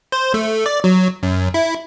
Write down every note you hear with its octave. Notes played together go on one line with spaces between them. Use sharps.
C5
A3
D5
F#3
F#2
E4